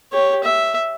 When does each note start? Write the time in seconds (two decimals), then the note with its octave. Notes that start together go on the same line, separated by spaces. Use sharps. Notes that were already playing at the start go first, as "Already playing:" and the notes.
0.13 G4 C#5
0.44 E5